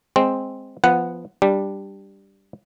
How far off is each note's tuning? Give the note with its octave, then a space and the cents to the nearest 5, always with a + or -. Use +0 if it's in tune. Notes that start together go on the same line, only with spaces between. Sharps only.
G#3 +0 C4 +0
F3 -15 B3 +0 F#5 +0
G3 +0 D4 +0